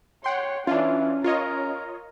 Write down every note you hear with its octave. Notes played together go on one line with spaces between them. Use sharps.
C#5 F#5 G5 C6
E3 C#4 D4 F4
F4 A#4 C#5 D#5